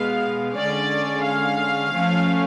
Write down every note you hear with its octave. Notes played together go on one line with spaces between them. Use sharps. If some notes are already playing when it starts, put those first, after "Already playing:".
Already playing: B2 G#3 B3 F5
D3 G#3 C#4 D5
F5
F3 A3 C#4